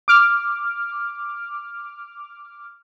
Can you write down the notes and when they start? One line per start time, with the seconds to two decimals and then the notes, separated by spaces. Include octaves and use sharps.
0.08 D6 F6